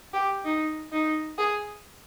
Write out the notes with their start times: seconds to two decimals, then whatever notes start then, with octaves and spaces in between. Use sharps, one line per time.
0.14 G4
0.45 D#4
0.92 D#4
1.38 G#4